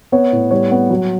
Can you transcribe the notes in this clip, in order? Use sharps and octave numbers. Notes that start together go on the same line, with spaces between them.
B3 C#5
A2
G3 C#5
B3
F#3